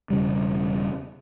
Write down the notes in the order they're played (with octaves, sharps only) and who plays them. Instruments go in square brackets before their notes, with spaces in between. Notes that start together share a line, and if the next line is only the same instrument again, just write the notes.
[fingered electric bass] E1 C#3 G3